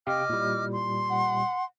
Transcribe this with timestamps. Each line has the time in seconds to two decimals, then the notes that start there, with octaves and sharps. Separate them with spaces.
0.07 C3 G4 D#5 F5 G5 D6 F6
0.30 A#2 G3 E4
0.72 C6
1.09 F#5